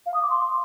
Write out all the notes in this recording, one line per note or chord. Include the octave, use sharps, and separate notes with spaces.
F5
D#6
D6
C6